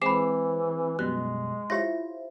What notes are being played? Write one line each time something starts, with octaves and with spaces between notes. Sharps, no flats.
E3 G#3 C4 G#5 B5 D6 C7 E7
F#2 B2 G3 G#3 F#6
E4 F4 G4 C5 C#5 E5 C6 A#6